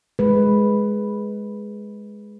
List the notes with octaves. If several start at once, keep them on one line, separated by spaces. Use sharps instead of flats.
G#3 B4